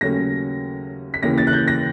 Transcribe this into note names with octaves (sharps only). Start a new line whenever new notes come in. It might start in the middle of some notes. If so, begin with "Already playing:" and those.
D#2 C#3 F#3 A3 C#4 A#6
B6
D#2 C#3 E3 A#6
A6
F#6
G6
A#6